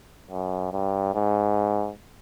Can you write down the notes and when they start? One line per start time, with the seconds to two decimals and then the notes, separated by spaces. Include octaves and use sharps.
0.31 F#2
0.72 G2
1.15 G#2